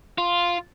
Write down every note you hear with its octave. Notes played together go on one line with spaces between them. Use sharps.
F4